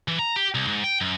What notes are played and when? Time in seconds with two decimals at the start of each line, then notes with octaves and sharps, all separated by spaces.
0.08 E3
0.19 A#5
0.36 G4
0.55 C2
0.67 G#2
0.84 G5
1.01 F#2